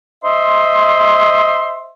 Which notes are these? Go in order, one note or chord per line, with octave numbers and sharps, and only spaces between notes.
C5 D#5 E5 C6